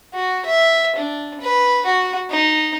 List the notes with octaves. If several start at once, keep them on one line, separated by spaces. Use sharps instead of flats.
F#4
E5
D4
B4
F#4
D#4